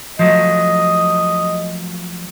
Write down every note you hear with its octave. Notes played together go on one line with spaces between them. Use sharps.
F3 F#3 A3 D#5